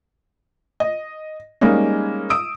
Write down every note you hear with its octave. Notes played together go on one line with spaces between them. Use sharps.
D#5
G3 G#3 A#3 C#4 D#4
D#6 E6 D7